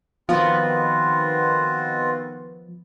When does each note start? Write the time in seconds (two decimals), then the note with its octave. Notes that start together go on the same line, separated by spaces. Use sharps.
0.29 D#3 F3 B3 C4 F4 F#4 F5